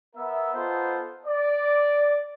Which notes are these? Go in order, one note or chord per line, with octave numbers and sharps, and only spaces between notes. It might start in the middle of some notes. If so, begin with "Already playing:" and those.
B3 A#4 E5
B3 D#4 F4 A4 C5
D5